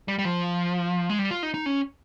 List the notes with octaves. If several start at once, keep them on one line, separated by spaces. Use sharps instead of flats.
G3
G3
F3
G#3
G3
F4
D#4
D#4
C#4